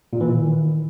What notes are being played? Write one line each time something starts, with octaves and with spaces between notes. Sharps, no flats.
A#2
E3
D#3